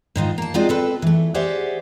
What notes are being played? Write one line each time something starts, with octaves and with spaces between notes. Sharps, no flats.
G#2 D#3 D#4 F4
A#3 A5
G#3 C4 F4 F#4 D5 D#5
C4 A4 B4
E3 A3
G4 G#4 C5 D5 E5 F#5